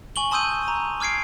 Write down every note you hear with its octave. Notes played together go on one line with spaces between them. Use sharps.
G#5 C#6 F#7 G7
A5 C6 D#6 E6 G6 D#7
A#5
D6 F6 G#6 C7 D7